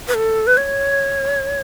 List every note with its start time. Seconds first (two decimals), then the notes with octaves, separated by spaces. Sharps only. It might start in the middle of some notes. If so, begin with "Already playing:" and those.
0.08 B4
0.14 A4
0.47 B4
0.57 C#5